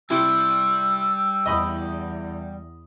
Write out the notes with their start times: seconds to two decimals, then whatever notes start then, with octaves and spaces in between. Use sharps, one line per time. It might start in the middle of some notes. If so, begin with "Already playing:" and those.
0.10 C3 G3 E4 G4 E6
1.46 E2 D#5 B5 D#6